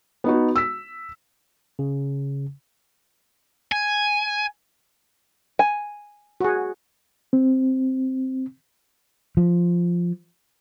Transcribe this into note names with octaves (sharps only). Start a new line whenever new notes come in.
B3 D#4 F#4
E6 B6
C#3
G#5
G#5
F#4 G#4
C4
F3